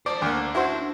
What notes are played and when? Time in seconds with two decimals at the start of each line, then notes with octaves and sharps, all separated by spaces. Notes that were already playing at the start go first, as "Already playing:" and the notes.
0.06 C5 D5 A5
0.22 D2 A#3 D4
0.55 E4 F#4 C5